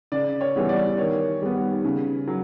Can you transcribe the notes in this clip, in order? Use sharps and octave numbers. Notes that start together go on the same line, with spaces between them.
C#3 D5
C#5
E3 G3 B3
D5
D#3 C#5
G3 B3
C#3
F#3